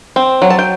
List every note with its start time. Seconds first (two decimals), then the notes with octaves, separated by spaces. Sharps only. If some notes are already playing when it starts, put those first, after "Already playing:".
0.16 C4
0.42 F#3
0.50 A5
0.59 G5